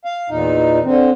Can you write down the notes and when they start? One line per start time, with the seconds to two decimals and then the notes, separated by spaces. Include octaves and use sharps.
0.05 F5
0.30 E2 A#2 D#4
0.85 D3 C4